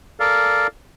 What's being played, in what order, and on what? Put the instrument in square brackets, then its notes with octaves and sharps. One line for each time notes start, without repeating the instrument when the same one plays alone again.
[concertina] A4 A#4 D5 F5